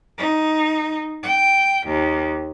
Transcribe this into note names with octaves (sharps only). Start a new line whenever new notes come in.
D#4
G5
D#2